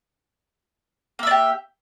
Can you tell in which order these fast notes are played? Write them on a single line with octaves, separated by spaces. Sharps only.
A#3 E5 D4 G4